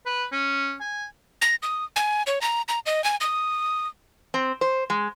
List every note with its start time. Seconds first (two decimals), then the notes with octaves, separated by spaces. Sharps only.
0.06 B4
0.32 C#4
0.81 G#5
1.42 A#6
1.63 D#6
1.96 G#5
2.27 C#5
2.41 A#5
2.69 A#5
2.86 D#5
3.04 G#5
3.21 D#6
4.34 C4
4.61 C5
4.90 G#3